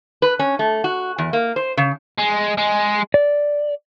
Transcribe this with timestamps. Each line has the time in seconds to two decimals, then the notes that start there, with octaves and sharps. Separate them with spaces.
0.22 B4
0.39 C#4
0.59 A3
0.84 F#4
1.18 E2
1.33 A#3
1.56 C5
1.77 C#3
2.19 G#3
2.58 G#3
3.14 D5